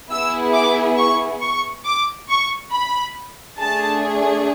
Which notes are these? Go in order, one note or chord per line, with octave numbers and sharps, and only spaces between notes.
B3 E4 G#4 E6
D6
C#6
C#6
D6
C#6
B5
A3 D4 G#4 A5